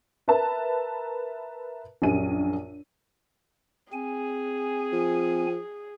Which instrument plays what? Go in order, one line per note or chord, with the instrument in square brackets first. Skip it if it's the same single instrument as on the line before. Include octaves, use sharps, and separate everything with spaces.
[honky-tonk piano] A#4 B4 E5 A5 A#5
A#1 F#2 G4 G#5 D#7
[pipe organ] C4 G#5 [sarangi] G#4
[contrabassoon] F3